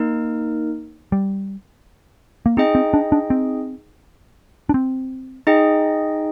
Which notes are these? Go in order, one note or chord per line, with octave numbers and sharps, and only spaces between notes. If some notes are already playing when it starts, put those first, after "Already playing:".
Already playing: A#3 D#4 A#4
G3
A#3
C4 D#4 G#4 D#5 G5
C4
D4
D4
C4
D4
C4
D#4 G#4 D#5 G5